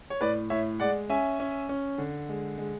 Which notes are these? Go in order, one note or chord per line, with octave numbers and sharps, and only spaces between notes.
C#5
A2 B4 D5
A2 C#5 E5
G#3 D5 F#5
C#4 E5 G#5
C#4
C#4
D3
G#3
G#3